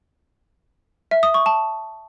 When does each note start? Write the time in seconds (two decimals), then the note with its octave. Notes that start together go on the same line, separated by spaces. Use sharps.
1.11 E5
1.23 D#6
1.34 C#6
1.46 A5